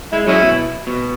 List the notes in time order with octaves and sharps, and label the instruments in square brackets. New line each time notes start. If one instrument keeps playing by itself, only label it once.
[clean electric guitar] G#3 [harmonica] E4
[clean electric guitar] F#3 [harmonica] G#3 C#4 E4
[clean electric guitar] B2
B2